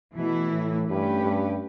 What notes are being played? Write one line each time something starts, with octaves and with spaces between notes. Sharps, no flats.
B2 E3 A3 E4
A2
G2 A3 C#4 G4 B4
G2